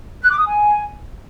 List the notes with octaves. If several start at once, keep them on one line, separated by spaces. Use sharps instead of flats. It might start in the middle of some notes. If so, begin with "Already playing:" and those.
F#6
D6
D#6
G#5